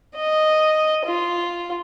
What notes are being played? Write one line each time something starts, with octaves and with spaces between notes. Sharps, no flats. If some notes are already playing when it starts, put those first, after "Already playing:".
D#5
F4